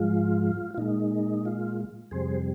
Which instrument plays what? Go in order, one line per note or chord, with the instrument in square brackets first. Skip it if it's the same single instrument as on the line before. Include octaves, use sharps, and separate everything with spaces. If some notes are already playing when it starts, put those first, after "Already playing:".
Already playing: [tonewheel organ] G#2 F3 G#3 F4
F4
A#2 G#3 D#4
F4
F2 C3 G3 G#4 C5